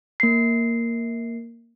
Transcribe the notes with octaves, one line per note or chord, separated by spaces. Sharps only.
A#3 C7